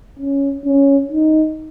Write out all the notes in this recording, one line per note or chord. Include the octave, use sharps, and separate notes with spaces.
C#4
C#4
D#4